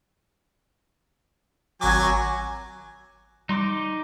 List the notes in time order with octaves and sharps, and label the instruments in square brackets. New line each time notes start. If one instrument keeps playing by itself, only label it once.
[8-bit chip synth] G#1 C#6 D6 [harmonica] F#3 G#5
[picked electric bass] G3 [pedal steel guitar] D#4 C6 D6